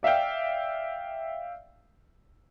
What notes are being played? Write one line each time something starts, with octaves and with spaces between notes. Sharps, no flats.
D5 E5 F5 G5